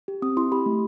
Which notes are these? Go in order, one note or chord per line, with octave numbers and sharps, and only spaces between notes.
G4
C4 D#6
E4 C6
G4 B5
A3